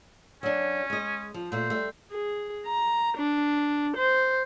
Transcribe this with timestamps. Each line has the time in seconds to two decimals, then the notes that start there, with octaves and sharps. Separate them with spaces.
0.43 F#3 C#4 D4
0.90 G#3 D#5
1.34 F3
1.52 A#2 A3 C5
1.70 G3 A3
2.11 G#4
2.67 A#5
3.18 D4
3.96 C5